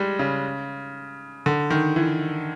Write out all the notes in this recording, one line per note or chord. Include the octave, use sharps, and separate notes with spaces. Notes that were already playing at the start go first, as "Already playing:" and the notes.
Already playing: G3 G#3
C#3
D3
D#3
E3